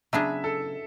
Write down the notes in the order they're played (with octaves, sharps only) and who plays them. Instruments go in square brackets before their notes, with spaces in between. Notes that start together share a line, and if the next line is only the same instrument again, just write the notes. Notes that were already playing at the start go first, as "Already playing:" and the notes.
[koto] C#3 F#3 B3 D4 G#4 [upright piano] E5
[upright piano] A4